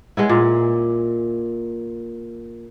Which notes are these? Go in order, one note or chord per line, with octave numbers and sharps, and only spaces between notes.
G#3 B3 E4
A#2